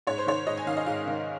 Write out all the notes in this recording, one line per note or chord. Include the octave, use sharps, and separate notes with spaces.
G#2 C#5
C5
D#3 C#5
G#2 D#5
G#5
D#3 F5
D#5
G#2 F5
D#3